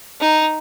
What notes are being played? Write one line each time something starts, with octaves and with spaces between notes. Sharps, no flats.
D#4